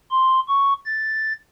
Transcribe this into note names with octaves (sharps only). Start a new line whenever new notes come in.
C6
C#6
A6